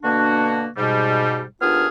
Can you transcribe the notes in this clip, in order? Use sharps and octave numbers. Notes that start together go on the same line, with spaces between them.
B2 D3 A#3 D4 F#4
G#2 B2 G3
D#2 B3 D4 F4 G#4 F6